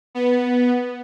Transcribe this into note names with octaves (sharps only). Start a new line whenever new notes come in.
B3